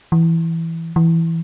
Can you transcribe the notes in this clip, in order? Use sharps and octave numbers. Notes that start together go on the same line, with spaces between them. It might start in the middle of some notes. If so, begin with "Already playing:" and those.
E3
E3